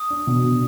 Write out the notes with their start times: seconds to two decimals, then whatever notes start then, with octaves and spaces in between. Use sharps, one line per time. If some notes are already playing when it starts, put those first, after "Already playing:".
Already playing: D#6
0.10 D4
0.27 B2
0.44 B2